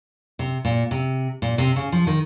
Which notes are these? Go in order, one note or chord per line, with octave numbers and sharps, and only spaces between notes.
C3
A#2
C3
A#2
C3
C#3
F3
D#3